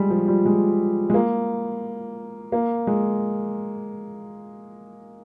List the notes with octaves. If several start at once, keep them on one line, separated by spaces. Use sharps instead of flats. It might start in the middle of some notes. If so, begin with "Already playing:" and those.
Already playing: G3 G#3
F3
G3
G#3
G#3
A#3
A#3
G#3